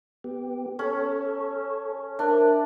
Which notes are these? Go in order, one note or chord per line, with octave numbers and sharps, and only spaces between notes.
B3 G4
C#4 A4 C#5
D4 A#4 C5 E5